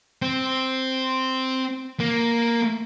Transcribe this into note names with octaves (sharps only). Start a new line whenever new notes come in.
C4
A#3